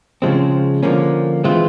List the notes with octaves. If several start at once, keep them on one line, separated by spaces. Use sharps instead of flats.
C#3 F3 G#3 C4
D3 F3 A#3 C#4
E3 G#3 C4 F4